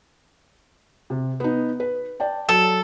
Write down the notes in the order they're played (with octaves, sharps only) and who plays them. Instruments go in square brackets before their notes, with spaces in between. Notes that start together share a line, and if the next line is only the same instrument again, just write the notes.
[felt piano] C3
B3 D#4
B4
D5 G5 A5
[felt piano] F#3 [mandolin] A4